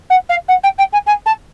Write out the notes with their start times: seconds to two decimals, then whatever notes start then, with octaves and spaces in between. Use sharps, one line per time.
0.10 F#5
0.29 F5
0.48 F#5
0.63 G5
0.78 G5
0.93 G#5
1.06 G#5
1.26 A5